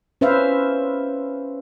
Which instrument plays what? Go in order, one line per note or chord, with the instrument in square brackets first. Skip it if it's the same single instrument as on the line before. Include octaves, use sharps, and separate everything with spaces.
[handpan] C#4 B4 C5 E5 F5